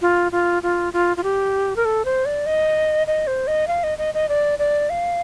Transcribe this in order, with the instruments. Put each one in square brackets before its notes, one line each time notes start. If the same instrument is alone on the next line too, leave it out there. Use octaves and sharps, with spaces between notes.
[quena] F4
F4
F4
F4
F4
G4
A#4
A4
C5
D5
D#5
D#5
C5
D#5
F5
D#5
D#5
D#5
D5
D5
F5